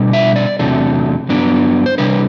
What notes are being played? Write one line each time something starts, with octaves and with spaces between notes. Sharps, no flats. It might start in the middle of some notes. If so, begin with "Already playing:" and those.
Already playing: B2 G3 D4
E5
D5
E2 C3 F#3 A3 D4
G2 F#3 B3 D4
C5
C3 G3 D4 B4